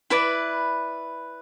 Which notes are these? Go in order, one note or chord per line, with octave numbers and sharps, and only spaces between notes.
E4 B4 D5 B5